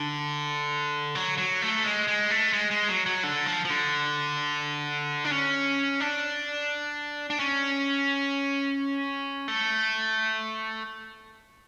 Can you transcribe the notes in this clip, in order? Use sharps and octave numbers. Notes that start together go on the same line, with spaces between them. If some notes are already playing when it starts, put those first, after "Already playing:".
Already playing: D3
F#3
F#3
A3
G#3
G#3
A3
G#3
G#3
F#3
F#3
D3
F3
F3
D3
D4
C#4
D4
D4
C#4
A3